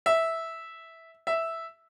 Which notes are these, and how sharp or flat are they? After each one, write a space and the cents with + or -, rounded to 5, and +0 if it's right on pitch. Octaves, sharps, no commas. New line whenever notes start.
E5 -10
E5 -5